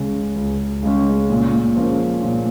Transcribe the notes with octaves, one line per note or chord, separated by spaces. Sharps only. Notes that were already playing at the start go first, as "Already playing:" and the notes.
Already playing: C#2 C#3 G#3 C#4
C#2
C#3 G#3 C#4
A#2
F3 A#3 C#4 G#4
A#2